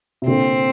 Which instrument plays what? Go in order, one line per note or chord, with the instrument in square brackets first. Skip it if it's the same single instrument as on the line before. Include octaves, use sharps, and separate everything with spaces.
[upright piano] C3
[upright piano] A#2 D3 [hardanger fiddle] C4